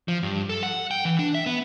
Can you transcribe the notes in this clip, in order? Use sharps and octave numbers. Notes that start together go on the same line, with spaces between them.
F3
G2
A4
F#5
G5
E3
D4
E5
B3